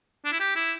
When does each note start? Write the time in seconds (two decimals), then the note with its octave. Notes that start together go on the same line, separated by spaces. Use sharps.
0.25 D4
0.32 E4
0.40 G4
0.56 E4